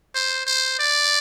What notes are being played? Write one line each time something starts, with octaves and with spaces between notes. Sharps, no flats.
C5
C5
D5